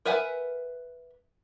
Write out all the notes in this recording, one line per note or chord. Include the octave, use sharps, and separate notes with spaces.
A#4 B4 E5 F#5 G#5